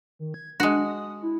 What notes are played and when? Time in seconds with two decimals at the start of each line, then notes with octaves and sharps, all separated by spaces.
0.19 D#3
0.34 G#6
0.60 G#3 D4 F#4
0.85 D#6
1.23 E4